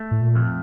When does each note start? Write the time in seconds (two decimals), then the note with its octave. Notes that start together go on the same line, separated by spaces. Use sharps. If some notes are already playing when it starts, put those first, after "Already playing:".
Already playing: A3
0.11 A2
0.21 A#2
0.35 F2